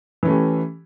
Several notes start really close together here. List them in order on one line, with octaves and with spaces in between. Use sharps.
E3 C#4 A3 G4